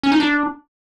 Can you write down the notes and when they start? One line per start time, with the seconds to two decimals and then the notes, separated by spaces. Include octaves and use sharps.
0.03 C#4
0.12 D#4
0.20 D4